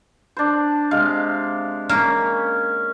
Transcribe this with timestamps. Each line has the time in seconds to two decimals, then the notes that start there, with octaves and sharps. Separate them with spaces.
0.37 D4 C5
0.91 C3 G#3 F5
1.89 A#3 C#4